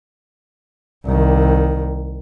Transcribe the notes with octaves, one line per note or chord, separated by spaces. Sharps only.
C2 D#3